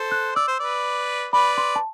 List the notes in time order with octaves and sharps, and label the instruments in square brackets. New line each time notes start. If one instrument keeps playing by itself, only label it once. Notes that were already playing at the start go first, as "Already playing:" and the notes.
Already playing: [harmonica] A4 C5
[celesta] F#6
[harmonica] D5 [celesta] E6
[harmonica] C5
B4 D5
[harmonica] B4 D5 [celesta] B5
[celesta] C6
A5